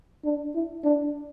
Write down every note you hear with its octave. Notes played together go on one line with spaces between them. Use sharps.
D4
E4
D4